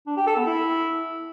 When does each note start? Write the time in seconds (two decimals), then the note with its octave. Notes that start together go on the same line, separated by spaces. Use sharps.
0.07 D4
0.17 G4
0.27 A4
0.37 B3
0.47 E4